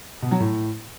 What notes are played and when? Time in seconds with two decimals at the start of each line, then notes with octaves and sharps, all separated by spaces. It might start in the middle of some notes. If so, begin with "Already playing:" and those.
0.22 B2
0.31 F#3
0.40 A2